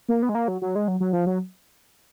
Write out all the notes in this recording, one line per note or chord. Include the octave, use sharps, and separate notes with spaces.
A#3
B3
G#3
A#3
F#3
F#3
G#3
F#3
F#3
F3
F#3